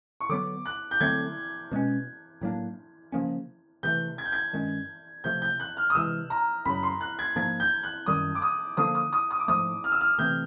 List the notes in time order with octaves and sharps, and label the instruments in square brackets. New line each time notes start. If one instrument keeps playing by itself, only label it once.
[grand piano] C#6
[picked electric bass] D3 F#3 B3 [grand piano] D6
[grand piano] F#6
G6
[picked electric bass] D3 F#3 A3 C4 [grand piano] G#6
[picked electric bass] B2 G#3 C#4
A2 F#3 A#3 D4
C#3 F3 A#3 C#4
[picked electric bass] C3 E3 A3 [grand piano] G6
[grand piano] G#6
G6
G#6
[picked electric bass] G2 D#3 G#3 C#4
[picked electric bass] C3 F3 A3 [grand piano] G6
[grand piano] G6
F#6
F6
D#6
[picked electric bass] C3 E3 G#3 [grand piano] E6
[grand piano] A#5
[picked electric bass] F#2 C#3 F#3 [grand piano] B5
[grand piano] C6
F#6
G#6
[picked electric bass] G#2 F3 A#3 D4 [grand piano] G#6
[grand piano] G6
F#6
[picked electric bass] F#2 D#3 G3 [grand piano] D#6
[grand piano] D6
D#6
[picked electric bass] D3 F3 A#3 D4 [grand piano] D#6
[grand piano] D#6
D#6
D#6
D6
[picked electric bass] G#2 F3 A3 [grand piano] D#6
[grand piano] F6
E6
F6
[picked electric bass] C3 E3 A3 C4 [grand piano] G6